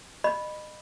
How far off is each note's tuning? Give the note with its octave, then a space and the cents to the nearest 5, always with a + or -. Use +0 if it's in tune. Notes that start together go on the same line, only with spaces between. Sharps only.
D#5 -30 B5 -5